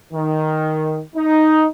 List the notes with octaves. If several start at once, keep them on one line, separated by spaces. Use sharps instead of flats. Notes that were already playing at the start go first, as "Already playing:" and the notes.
D#3
D#4